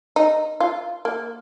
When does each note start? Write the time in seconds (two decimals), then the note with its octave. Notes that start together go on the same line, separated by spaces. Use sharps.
0.16 D#4
0.60 F4
1.05 A#3